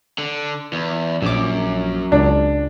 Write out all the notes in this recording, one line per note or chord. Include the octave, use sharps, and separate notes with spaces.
D3
E2
A#1 F#2 D6
C#2 D4